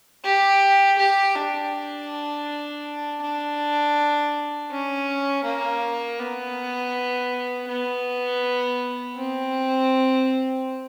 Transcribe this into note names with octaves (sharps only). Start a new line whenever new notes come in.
G4
G4
D4
D4
C#4
A#3
B3
B3
C4